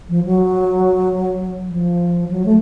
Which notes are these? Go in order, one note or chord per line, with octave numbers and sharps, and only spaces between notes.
F3
F#3
F3
F#3
A3